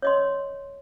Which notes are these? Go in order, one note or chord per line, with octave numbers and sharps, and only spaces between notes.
C#5 D#5 C6